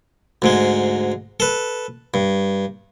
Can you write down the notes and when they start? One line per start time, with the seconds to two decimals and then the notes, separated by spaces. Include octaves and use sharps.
0.42 D2 G#2 G#3
1.40 A4 B4
2.14 G2